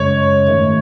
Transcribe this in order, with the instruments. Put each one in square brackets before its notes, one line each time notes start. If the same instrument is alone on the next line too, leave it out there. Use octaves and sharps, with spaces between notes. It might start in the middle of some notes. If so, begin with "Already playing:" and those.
Already playing: [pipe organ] F#2 C#3 G#3 [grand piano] C#5
[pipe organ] G#2 D#3 A3